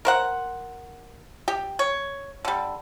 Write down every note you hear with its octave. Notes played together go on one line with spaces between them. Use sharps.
A#4 C5 F#5
G4
C#5
D3 G3